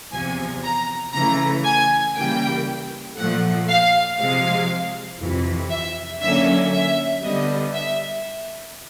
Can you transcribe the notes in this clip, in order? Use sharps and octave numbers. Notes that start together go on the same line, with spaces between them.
E2 C3 F3 G#5
A#5
C#3 E3 A3 A#5
G#5
C#3 E3 G3 A#3 G5
A#2 F3 A3 F#5
F5
C3 F3 G#3 F5
F2 C3 E3
E5
D3 F#3 A#3 C#4 E5
E5
D3 G3 B3 D#5
E5